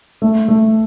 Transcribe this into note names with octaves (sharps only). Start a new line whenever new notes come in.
A3
A3